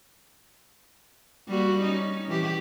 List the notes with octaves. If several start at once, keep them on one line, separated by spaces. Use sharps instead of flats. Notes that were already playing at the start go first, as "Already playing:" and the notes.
G3 A#3 F#4
C#4 D#4
E3 G4